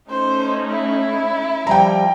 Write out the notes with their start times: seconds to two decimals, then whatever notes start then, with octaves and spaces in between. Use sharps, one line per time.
0.10 A3 C#4 D#4 C5
0.70 E4
1.67 F3 G3 G5 A#5